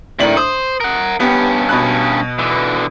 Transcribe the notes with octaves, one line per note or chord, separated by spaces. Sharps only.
A2 C3 D#3 D4 F#7
C5 D#6
A#4 F#5
G2 B3 C#4 G4
B2 B5 F#6
D3 E3